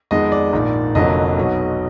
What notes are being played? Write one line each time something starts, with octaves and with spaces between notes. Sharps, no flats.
F2 D#3 G#3 B3 D#5
D5
A#1 G#2 D#3 A#3
F1 F2 D3 F#3 A#3 D#5
B1 B2 F#3